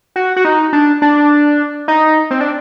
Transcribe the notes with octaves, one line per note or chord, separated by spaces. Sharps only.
F#4
F#4
D#4
D4
D4
D#4
C4
D4